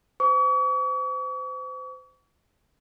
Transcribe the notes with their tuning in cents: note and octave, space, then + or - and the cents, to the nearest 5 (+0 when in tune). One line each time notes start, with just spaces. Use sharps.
C5 -35 C#6 +45